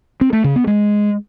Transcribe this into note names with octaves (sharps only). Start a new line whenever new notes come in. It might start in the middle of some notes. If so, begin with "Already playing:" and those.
C4
A3
C#3
B3
G#3